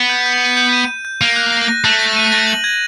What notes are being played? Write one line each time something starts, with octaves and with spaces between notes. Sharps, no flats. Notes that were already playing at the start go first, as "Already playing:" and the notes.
Already playing: B3
G6
G6
D#7
G6
D#7
D#7
G6
A#3 D#7
F#6
A#6
A#6
A3 F#6
A#6
D#7
A#6
F#7
G#6